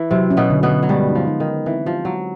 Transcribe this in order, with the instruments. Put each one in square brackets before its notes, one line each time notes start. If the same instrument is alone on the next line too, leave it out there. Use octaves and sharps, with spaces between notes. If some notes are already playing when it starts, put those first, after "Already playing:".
Already playing: [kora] E3 E4
[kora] C3 C4 [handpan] F#3
[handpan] C#4
[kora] B2 B3
[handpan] D3
[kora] B2 B3
[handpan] D3
[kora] F#3
[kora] G2 G3 [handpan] G#3
[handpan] D#4
[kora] F3
[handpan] D#4
[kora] D#3
[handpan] D#4
[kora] E3 [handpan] C4
[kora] F3 [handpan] G4
[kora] F#3 [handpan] G#3